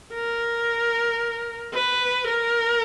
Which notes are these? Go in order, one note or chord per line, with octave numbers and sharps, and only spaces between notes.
A#4
B4
A#4